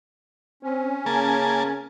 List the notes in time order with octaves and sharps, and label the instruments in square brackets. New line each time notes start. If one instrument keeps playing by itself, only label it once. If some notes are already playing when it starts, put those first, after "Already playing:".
[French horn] C4 [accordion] C#4
[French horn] C#3 [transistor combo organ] A#3 G#5 A5